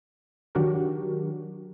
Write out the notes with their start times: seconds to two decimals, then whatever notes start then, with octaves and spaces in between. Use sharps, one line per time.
0.55 D#3 F#3 D4 F#4 G4 A#4